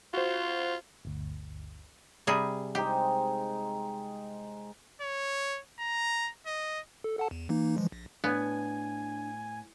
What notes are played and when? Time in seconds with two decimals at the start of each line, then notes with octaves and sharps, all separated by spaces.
0.14 F4 F#4 C5
1.05 G1 D2
2.27 C3 G3 G#4
2.75 G#3 C4 D#4 G4
5.01 C#5
5.79 A#5
6.46 D#5
7.04 A4
7.17 A4 F#5 A5
7.31 E2
7.49 E3 A#3 D#4
7.77 E3 F3 G#3
7.92 A#1
8.24 A2 B3 D4 G#5